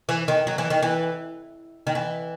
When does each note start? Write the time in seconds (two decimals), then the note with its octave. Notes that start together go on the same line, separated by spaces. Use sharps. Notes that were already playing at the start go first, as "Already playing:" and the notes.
0.09 E3
0.28 D#3
0.47 F#3
0.58 E3
0.70 D#3
0.83 E3
1.87 D#3
1.95 E3